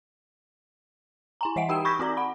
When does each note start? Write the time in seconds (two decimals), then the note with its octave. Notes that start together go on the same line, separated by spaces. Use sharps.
1.41 E4 G#5 A#5
1.56 E3 D#5 E5 F#5 D7
1.69 D#4 G4 G5 E6 E7
1.85 B5 C#6 G6 G#6 A#6 B6
1.99 C4 F#4 D5 A#5
2.17 F#5 B5